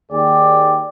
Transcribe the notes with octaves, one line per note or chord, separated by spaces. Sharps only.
D#2 G#4 D5 G5